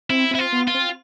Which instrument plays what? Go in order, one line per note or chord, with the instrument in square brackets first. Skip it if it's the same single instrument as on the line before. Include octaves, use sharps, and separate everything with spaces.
[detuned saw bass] C4 [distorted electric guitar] E4
[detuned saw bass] C4 [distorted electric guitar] E4
[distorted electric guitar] F4
[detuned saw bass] B3
[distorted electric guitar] F4
[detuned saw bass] C4